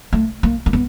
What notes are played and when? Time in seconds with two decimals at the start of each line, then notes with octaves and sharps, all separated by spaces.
0.13 A3
0.43 A#3
0.66 A#3
0.73 B3